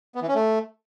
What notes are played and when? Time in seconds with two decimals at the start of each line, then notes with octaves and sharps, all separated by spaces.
0.15 B3
0.22 E3
0.28 C#4
0.35 A3